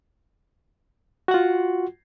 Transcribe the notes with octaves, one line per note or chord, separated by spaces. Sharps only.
F4 F#4 F#5